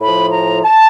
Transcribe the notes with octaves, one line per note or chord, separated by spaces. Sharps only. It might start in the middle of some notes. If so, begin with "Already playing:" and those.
A2 F3 B5
A#5
A5